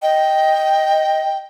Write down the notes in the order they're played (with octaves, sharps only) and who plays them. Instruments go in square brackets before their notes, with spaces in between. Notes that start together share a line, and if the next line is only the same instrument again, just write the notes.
[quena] D#5 [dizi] G5